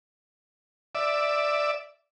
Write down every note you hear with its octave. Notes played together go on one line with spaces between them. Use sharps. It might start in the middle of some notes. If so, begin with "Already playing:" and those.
D5 E5